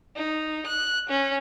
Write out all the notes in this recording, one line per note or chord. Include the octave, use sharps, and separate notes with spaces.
D#4
F#6
C#4